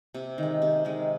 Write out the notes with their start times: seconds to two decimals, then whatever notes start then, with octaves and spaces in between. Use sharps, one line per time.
0.14 C3
0.38 D#3 G#3
0.62 C3
0.85 D#3 G#3